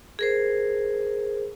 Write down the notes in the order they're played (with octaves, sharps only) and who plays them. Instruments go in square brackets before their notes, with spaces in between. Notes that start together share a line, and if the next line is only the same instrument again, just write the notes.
[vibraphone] G#4 A#4 C5